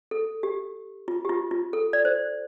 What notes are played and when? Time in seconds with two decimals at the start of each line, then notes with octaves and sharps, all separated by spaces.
0.11 A4
0.43 G4
1.08 F4
1.25 G4
1.29 F4
1.51 F4
1.73 A4
1.93 D5
2.05 C5